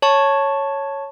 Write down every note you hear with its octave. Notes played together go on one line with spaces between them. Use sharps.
C#5 A5 C#6